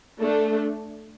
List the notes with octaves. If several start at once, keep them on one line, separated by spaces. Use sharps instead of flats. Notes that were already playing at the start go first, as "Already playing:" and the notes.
A3 D4